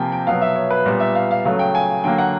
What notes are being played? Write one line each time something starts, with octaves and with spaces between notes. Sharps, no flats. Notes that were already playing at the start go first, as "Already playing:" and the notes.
Already playing: C3 F3 A#3 G5 G#5
G5
B2 F#3 B3 F5
E5
C#5
B4
A#2 G3 B3 F5
E5
F5
F5
C#3 F#3 A3 F5
G5
G#5
D3 F#3 A#3 G5
F#5